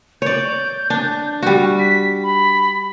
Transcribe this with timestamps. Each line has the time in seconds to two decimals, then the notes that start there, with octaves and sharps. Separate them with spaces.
0.22 C#5 D5 G6
0.90 D4
1.42 G3 F#4
1.79 B6
2.23 B5